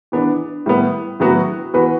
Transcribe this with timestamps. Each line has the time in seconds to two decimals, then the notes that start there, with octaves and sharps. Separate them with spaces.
0.12 E3 B3 D4
0.66 A2 G3 B3
1.20 A2 F#3 B3 F#4
1.74 E3 B3 F#4 B4